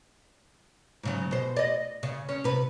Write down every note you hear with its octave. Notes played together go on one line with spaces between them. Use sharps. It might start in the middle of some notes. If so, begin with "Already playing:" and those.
G#2 C#3 F#3
B2 C5
D5 D#5
C#3
C#4
C3 B4